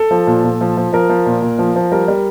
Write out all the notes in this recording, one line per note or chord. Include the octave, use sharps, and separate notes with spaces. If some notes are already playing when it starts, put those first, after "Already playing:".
Already playing: A4
F3
A#2
A#2
F3
F3
F3 A#4
F3
A#2
A#2
F3
F3
G3 A#4
G3